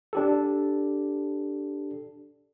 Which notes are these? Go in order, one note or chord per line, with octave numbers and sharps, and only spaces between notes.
D4 G4 A4